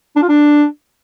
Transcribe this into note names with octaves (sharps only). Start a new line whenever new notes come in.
D4
F4
D4